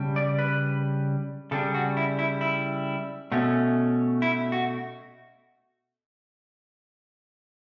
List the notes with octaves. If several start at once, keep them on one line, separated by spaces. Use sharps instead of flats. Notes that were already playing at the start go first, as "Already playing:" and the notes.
Already playing: C#3 G3 D4
D5
B4
C#3 G3 D4 A4
F#4
E4
E4
E4
B2 A3 C#4
E4
F#4